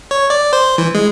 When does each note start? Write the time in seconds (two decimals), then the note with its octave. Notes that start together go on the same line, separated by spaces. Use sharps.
0.11 C#5
0.30 D5
0.53 C5
0.78 E3
0.95 G#3